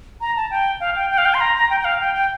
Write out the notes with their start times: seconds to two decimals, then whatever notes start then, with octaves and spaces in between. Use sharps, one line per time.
0.21 A#5
0.36 A5
0.51 G5
0.80 F5
0.96 G5
1.10 G5
1.18 F5
1.25 G5
1.34 C6
1.41 A#5
1.55 A#5
1.70 G5
1.80 G5
1.85 F5
2.00 G5
2.15 G5